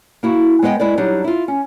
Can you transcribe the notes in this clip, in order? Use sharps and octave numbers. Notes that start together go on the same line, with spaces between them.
A#3 E4 F#4
G#3 B3 B4 D#5 G5
G#3 E4 B4 D5
F#3 G3 D4 D#4
E4 F4
C#4